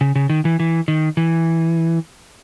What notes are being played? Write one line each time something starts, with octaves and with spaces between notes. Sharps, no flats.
C#3
C#3
D#3
E3
E3
D#3
E3